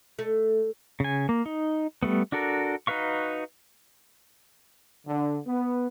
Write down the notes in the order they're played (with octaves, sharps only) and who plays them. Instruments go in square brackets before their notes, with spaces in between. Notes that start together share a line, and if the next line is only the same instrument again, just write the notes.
[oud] A3
[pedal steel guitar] C#3 G#5
A#3
D#4
G3 A3 B3
D4 F#4 A4 A#4
D#4 F#4 B4 F5 C#6
[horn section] D3
B3